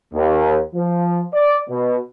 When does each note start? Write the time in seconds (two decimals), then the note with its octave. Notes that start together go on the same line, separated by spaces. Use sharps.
0.14 D#2
0.75 F3
1.33 D5
1.69 B2